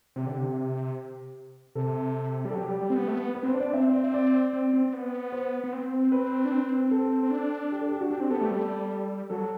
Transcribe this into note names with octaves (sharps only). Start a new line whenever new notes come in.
C3 G4
D3
C3
C3 A4
G3
A4
F#3 G4
G3
G3
C4
B3
A3
B3
B4
C4 C5
D4
D5
C4 E5
D5
E5
D5
C4
C4
B3
C5
B3
C4
B4
D4
C4
A4
C4
D4
G4
A4
G4
F#4
D4 G4
C4
B3 A4
A3 G4
G3 A4
F#3 A4